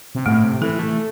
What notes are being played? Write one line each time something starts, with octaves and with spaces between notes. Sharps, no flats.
C3
A2 A3
C3
E3 A4
A3